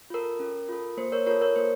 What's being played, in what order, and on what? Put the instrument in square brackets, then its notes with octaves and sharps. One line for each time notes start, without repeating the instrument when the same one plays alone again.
[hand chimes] F4 A4 A#4
C#4
F4 A4
A#3 C5
A#4 C#5
F4 A4 A#4 C#5
A#4 C#5
A#3 C5